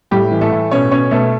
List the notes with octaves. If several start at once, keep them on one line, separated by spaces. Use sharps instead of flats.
A2 G3 G4
E3
A3 A4
A2
B2 C#4 C#5
B2 C#4 C#5
B2 A3 A4